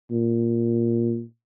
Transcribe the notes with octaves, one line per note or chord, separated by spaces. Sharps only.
A#2